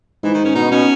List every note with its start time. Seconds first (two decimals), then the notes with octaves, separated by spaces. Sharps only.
0.23 G#2 E3
0.34 D#3
0.45 C#4
0.55 B2 D#4
0.71 B2 C#4